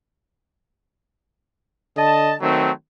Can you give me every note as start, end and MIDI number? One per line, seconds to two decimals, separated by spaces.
1.97 2.35 50
1.97 2.35 75
1.97 2.35 81
2.41 2.71 51
2.41 2.71 54
2.41 2.71 57
2.41 2.71 60